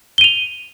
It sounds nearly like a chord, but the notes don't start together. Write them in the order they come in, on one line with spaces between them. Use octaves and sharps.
G7 D#7 F7